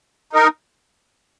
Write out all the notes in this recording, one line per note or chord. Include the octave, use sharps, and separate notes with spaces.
D#4 A#4